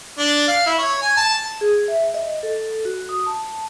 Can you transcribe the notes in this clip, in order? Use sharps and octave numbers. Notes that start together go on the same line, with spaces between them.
D4
F5
E4
C#5
G#5
A5
G#4
E5
D#5
A4
F#4
D#6
A5